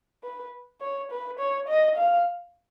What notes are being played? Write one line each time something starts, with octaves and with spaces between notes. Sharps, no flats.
B4
C#5
B4
C#5
D#5
F5